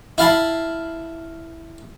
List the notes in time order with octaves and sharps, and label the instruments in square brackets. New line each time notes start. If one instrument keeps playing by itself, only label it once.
[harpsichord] E4 F5 A5 B5